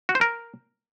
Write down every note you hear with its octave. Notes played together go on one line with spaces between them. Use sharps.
F#4
C5
A#4